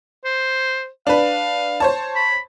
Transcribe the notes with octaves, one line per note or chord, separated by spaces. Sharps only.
C5
D4 B4 F5
C5 C#5 A5
B5